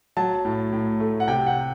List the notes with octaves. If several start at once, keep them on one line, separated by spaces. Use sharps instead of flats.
F#3 A5
A2
A2
A3
F#5
C3 G5
F#5